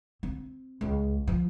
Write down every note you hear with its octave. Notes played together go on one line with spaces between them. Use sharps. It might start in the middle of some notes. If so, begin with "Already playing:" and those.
C4
C#2
F3